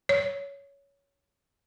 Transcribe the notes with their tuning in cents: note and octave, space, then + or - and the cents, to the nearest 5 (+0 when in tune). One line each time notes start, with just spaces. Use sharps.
C#5 +10